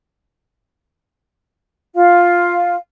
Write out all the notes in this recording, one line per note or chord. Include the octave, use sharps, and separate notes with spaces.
F4 F5